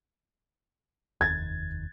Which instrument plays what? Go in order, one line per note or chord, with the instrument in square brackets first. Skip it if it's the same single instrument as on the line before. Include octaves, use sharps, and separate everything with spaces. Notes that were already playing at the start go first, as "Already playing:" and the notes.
[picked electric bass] F1 D#2 [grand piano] G#6 A6